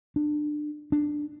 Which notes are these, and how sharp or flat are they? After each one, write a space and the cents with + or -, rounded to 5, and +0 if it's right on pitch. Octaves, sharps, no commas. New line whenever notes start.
D4 +25
D4 +10